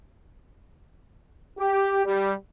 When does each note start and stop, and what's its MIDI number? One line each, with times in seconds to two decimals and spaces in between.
1.58 2.05 67
2.05 2.32 55